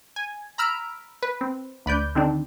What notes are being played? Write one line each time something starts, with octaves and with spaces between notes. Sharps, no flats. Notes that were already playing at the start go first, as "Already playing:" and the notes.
G#5
A#5 B5 E6 F6 D7
B4
C4
D2 B4 D5 G6
D3 D#3 C4 D4